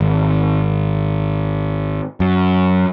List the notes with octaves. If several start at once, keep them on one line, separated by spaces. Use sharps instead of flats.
G#1
F#2